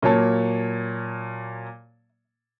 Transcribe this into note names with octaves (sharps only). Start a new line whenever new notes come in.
A#2 F#3 A#3 C#5 A5